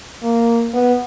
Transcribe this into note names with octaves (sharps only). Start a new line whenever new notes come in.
A#3
B3